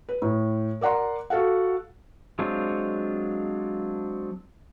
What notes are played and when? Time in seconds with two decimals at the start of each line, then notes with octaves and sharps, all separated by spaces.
0.09 B4
0.22 A2
0.81 A#4 D5 F#5 A#5 C6
1.30 F#4 A4 F5 F#5
2.39 F#3 G#3 C4 D4 F4